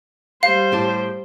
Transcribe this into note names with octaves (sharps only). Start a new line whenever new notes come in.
G3 C5 F5
A2 G4 A5